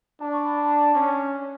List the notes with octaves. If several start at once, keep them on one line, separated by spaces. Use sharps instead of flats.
D4 A5
C#6
B5
A5
C#4